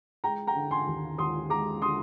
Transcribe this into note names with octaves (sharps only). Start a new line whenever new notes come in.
G#3 G5 A#5
G5 A#5
D3
G#5 C6
D#2
D#2 C6 D#6
G#3 A#5 D6
D3 C6 D#6